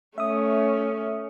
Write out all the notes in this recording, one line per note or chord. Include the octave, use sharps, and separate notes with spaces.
A3 C#4 E5 D#6